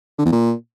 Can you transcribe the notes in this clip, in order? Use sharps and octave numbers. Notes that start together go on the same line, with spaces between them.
D3
E2
A#2